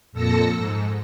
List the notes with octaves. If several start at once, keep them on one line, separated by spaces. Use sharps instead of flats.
F2 A#2 A4 E6 A#6 C#7
G#2